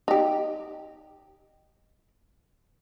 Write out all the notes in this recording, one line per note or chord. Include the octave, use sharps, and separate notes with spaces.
D#4 G4